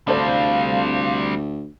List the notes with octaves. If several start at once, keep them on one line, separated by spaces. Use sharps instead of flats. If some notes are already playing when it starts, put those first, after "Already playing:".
D2 G3 C4 D4 A4 C5 F5